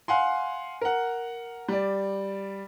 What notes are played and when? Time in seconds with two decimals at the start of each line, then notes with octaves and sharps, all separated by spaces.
0.08 F5 F#5 G#5 C6
0.81 A#4 F#5
1.68 G3 D5